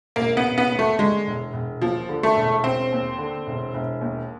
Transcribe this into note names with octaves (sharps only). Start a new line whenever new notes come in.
E1 A#3
B3
E1
B3
D#2
A3
D3 G#3
E1
E1
D#2 F3
D3
A3
E1
E1 C4
D#2
D3
E1
E1
D#2